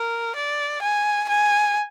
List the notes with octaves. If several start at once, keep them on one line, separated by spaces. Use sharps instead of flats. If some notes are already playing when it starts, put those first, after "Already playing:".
Already playing: A#4
D5
G#5
G#5